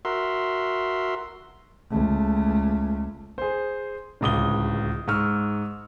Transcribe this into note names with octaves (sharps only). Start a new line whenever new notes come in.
F#4 A#4 E5 C6
C#2 A3
G#4 C5
D1 C#2 D#6 G7
G#2 C#6 E6 F6